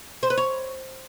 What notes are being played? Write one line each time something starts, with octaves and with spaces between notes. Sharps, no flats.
C5
B4
C#5